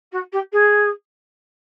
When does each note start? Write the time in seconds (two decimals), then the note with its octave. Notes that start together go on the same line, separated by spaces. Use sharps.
0.12 F#4
0.32 G4
0.52 G#4